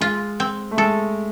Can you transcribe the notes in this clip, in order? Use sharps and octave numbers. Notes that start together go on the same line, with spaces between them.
G#3 F4
C4
A3
G#3 A4